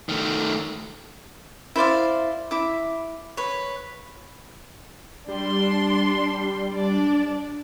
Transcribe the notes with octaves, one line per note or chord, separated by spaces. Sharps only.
D#3 A3
E4 C5 D5 F5
E4 D6
B4 C#5
G3 D4 C6
D4 D5